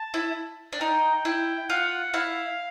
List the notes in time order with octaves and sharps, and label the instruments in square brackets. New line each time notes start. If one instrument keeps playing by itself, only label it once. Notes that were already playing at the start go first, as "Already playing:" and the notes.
Already playing: [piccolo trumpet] A5
[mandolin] E4
D4
[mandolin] D#4 [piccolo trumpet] G5
[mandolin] E4 [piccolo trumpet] G5
[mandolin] F4 [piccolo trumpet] F#5
[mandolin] E4 [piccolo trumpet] F5